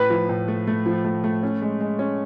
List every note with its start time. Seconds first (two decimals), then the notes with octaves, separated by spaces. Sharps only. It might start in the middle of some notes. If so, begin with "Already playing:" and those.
Already playing: A2 B4
0.10 F3
0.29 A2
0.48 A3
0.67 A3
0.86 F3
1.05 A3
1.24 A3
1.43 C#4
1.62 G#3
1.81 G#3
1.99 C#4